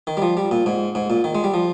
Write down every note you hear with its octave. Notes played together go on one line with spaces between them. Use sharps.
D#3
G3
F3
G3
A#2
G#2
G#2
A#2
D#3
G#3
G3
F3